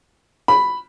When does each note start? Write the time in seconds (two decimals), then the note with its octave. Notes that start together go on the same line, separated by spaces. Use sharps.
0.48 B5